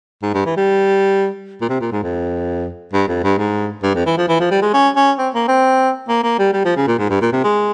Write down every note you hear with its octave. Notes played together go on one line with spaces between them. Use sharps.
G#2
G2
E3
G3
A#2
C3
A#2
G#2
F2
G2
F2
G2
G#2
G2
F2
E3
F3
E3
F3
G3
G#3
C#4
C#4
C4
A#3
C4
A#3
A#3
G3
G3
F3
C#3
A#2
G#2
G2
A#2
C3
G#3